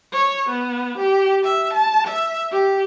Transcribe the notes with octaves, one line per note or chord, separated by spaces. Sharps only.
C#5
B3
G4
E5
A5
E5
G4